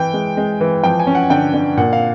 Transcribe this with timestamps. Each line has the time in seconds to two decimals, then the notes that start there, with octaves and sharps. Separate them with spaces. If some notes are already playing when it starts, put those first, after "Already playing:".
Already playing: E3 G5
0.14 G#3
0.37 G#3
0.61 E3
0.83 F3 G5
0.99 G#5
1.07 C#4
1.15 F#5
1.30 D3 G5
1.54 D3
1.77 A#2 F#5
1.93 F5